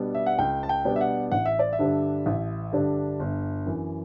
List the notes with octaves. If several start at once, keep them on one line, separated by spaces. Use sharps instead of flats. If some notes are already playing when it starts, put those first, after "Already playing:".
Already playing: B2 G3 B3 D4
E5
F#5
C#2 G5
A5
G5
B2 G3 B3 D4
E5
F#5
A1 F#5
E5
D5
E5
G2 D3 G3 D4
A1
G2 D3 G3 D4
G1
F#2 E3